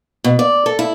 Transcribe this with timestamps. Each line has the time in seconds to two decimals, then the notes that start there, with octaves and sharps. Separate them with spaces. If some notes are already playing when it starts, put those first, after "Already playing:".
0.24 B2
0.39 D5
0.66 A4
0.79 E4